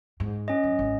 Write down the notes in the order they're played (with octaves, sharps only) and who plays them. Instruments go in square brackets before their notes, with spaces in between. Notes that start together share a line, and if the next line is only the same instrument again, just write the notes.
[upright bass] G#2
[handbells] C#4 D#5
[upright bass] F#2
G#1